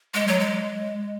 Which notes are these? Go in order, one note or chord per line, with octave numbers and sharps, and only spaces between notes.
G#3
F#3
G#3